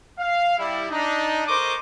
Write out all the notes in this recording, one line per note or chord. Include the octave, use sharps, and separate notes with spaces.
F5
G3 E4
D4 D#4
A4 A#4 C5 D#5 C#6 D6